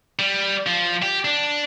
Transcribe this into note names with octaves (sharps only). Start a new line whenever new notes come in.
G3
F3
G4
D4